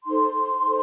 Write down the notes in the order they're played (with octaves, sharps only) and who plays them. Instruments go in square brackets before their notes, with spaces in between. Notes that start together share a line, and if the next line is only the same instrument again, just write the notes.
[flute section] D#4 A4 C5 C6
D#4 A4 C5